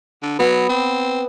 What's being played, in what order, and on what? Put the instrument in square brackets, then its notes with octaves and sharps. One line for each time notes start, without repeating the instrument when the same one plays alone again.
[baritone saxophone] D3
[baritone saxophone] F#3 [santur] B3
[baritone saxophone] C4